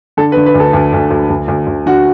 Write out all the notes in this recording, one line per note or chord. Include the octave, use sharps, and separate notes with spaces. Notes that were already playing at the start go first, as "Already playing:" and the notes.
D3 A4
B4
D3
B4
D2
A4
D2
D2
D2
D2
D2
D2
D3 F#4